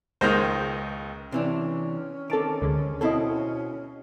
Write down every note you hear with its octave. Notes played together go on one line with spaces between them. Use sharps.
C#2 D#3 G#3 C5 A#6
C3 E3 C#4 D4
D#3 C4 A4 A5 D6
D2 D3 G#3
B2 C4 E4 A4 D#5